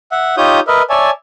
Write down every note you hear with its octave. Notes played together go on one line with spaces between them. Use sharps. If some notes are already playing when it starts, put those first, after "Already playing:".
E5 F#5
D#4 F4 G4 C#5 D#6 G6
A#4 B4 D#5 E5
C#5 D5 E5 G#5 A5